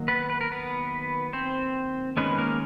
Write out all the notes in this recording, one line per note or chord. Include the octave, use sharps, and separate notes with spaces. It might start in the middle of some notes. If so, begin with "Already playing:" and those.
Already playing: D#3 F#3 A#3
B3 B4
B4
A#4
B3 B4
C4 C5
D#3 G#3 B3 C#4 B4
A#3 A#4